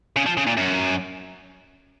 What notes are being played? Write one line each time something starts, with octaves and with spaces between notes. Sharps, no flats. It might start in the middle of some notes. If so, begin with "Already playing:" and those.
C#3
F3
C#3
A#2
F#2